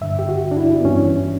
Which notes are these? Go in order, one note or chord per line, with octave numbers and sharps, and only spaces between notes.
G2 D3 E5
G4
F#4
D4
E4
B3
G2 E3 C#4